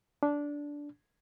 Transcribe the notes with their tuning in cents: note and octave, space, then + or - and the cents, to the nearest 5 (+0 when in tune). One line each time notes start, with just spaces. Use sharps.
D4 -15